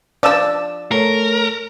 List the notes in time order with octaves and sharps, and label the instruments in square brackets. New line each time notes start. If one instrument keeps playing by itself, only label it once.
[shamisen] F3 D4 [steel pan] D5 E6
[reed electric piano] A3 A4 C#5 [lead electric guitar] A#4